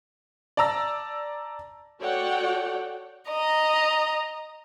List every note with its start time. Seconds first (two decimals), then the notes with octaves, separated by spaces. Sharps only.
0.57 D5 A5 A#5 E6 A#6
1.99 F#4 A4 C#5 D5 F#5 G5
3.29 D#5 A#5